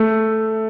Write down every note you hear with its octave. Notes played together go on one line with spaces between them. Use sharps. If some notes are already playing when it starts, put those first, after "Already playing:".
Already playing: A3